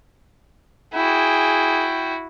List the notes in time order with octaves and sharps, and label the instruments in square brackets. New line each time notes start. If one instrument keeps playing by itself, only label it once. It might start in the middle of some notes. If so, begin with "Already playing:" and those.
[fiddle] E4 F#4 [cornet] G#4 [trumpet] G5